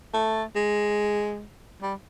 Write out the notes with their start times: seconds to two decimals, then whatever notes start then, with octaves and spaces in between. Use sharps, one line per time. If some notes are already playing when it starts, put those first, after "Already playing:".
0.14 A3
0.56 G#3
1.82 G3